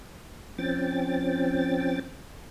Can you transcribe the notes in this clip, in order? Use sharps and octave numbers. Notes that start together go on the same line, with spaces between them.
F3 C4 C#4 G5 A6